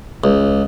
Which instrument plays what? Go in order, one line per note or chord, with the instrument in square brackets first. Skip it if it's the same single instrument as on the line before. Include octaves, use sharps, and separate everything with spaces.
[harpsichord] C#2